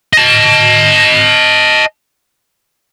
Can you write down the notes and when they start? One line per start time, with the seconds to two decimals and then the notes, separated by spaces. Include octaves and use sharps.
0.13 D#5 A5